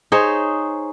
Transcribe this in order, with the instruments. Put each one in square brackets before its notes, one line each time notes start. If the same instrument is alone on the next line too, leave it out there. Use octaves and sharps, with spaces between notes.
[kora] D#4 G#4 C5 C#5